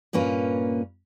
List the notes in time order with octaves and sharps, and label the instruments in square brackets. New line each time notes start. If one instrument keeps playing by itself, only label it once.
[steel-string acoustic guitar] G2 A#2 A#3 C#4 B4